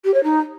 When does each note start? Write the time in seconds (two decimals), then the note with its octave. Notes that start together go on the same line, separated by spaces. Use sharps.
0.04 G4
0.14 C#5
0.23 D#4